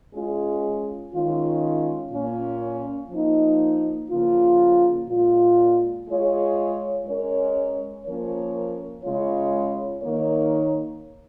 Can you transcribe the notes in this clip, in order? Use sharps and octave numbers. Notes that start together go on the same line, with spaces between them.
G#3 C#4 F4 G#4
D#3 G#3 C#4 F4
A#2 A#3 C#4 F4
F3 A#3 D#4
C#3 F3 A#3 F4
A#2 G#3 F4
G#3 F4 G#4 C#5
G#3 C#4 A#4 C#5
F3 A#3 C#4 A#4 C#5
C#3 G#3 F4 C#5
D#3 A#3 D#4 A#4 C#5